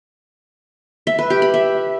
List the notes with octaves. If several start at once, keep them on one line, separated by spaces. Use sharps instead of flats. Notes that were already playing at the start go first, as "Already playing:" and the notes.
E5
B4
G4
B5
E5